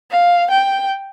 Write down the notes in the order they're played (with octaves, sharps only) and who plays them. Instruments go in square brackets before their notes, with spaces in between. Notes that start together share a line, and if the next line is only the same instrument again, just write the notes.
[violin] F5
G5